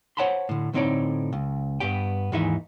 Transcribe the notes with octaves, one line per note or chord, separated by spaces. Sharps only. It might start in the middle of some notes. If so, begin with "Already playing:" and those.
C5 C#5 F#5 A5 B5 C6
A2 D3
A2 D3 C4 D#4 C#5 D5
C#2
G2 B3 G4 G5
D#2 G#2 E3 D#4 G#4 E5